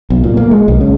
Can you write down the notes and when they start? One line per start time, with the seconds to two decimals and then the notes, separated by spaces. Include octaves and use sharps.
0.10 B1
0.24 A#2
0.37 A#3
0.51 G#3
0.68 B1
0.81 C#3